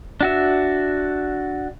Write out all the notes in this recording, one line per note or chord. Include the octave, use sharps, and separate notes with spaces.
D4 F#4 E5